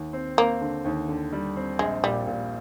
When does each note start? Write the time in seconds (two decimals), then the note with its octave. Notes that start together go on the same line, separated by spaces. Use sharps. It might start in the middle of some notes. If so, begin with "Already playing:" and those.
Already playing: D#2
0.13 C4
0.37 A#3 C4
0.61 D3
0.85 D#2
1.08 D3
1.32 G3
1.56 C4
1.79 A#1 G#3
2.03 A#2 G3
2.27 A#2